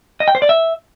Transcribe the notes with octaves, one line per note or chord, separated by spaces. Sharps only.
D#5
G5
C5
D5
E5